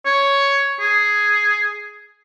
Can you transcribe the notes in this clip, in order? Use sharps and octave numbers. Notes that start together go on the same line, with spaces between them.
C#5
G#4